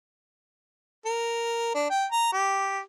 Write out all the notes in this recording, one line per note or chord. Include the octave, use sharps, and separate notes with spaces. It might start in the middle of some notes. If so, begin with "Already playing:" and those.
A#4
D4
G5
A#5
G4